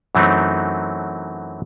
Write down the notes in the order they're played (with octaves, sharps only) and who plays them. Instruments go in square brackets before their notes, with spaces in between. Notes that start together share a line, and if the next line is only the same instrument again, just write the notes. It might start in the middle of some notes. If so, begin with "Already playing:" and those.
[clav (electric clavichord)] F#2 E3 F#3 A3 C4 D#4